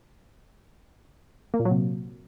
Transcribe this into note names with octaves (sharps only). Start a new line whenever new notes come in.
A#3
A#2
F#3
C3